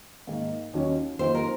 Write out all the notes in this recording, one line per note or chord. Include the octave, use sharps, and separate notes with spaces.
G#2 D#3 A#3
D#2 D#3 F#3 C#4
F2 D#3 A#3 C5
A#4